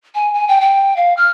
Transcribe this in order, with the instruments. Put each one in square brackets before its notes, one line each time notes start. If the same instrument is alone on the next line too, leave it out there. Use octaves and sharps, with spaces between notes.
[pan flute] G#5
G#5
G5
G5
F5
F6